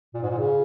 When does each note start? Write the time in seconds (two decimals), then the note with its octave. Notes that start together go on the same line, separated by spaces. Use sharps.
0.14 A#2
0.22 G#2
0.30 A#2
0.38 C#3